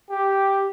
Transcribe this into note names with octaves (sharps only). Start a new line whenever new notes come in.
G4